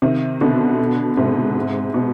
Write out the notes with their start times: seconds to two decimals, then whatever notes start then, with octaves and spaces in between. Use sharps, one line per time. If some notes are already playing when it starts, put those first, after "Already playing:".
0.02 C3 D#3
0.41 B2 D3
1.17 G#2 C3
1.94 B2